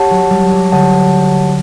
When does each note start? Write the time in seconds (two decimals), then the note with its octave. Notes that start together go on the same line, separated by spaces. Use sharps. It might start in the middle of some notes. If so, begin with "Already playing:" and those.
Already playing: G4 C#5 F#5 A5
0.10 F#3
0.30 G3
0.51 F#3
0.72 D3 G4 C#5 F#5 A5